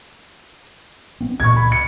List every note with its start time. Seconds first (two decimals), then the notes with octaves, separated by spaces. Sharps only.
1.21 B3 C4
1.40 C#2 A#2 C#6 G#6
1.56 B5
1.72 C#7